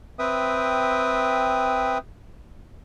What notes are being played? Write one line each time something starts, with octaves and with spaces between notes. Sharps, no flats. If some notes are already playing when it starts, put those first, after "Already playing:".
C4 B4 E5 G5 D#6